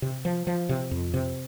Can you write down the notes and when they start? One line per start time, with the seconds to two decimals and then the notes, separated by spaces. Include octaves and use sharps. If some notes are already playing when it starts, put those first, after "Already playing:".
0.02 C3
0.25 F3
0.47 F3
0.69 C3
0.91 F2
1.14 C3